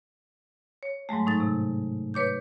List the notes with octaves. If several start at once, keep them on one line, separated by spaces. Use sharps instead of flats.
C#5
G#2 F#3 G#3 A3
A2 D#4 A6
C3
B4 C#5 D6 G6